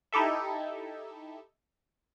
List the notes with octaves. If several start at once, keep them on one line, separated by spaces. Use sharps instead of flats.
D#4 E4 G4 A4 E5